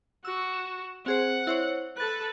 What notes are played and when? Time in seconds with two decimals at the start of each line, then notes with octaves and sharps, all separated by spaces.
0.25 F#4 E6
0.54 E7
1.06 C4 G#4 C5 F#5
1.47 E4 C5 C#5
1.97 A4 B4 F#6 A6